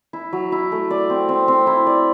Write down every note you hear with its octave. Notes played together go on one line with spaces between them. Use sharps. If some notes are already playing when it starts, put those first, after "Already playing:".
E4
F#3
E4
A3
D5
C4
C4
C4
E4
D5